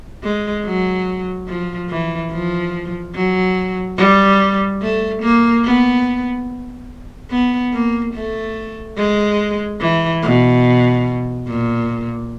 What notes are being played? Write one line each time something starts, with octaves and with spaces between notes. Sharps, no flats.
G#3
F#3
F3
E3
F3
F#3
G3
A3
A#3
B3
B3
A#3
A3
G#3
E3
B2
A#2